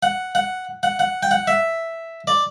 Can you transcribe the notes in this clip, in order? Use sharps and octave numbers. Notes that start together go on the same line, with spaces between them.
F#5
F#5
F#5
F#5
G5
F#5
E5
D5